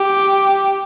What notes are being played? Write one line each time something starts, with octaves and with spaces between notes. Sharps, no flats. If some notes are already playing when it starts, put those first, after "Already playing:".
Already playing: G4